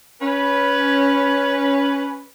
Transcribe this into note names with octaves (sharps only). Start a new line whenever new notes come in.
C#4 B4